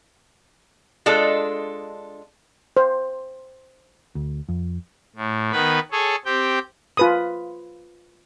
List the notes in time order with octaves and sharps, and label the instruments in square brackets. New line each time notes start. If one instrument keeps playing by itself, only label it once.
[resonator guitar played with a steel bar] G#3 D4 F4 A4
[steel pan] C5
[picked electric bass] D2
F2
[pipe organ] A2
D#3 B3 B4 B5
G#4 A4 C#5
C4 G4 G5
[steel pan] F4 B4 D#6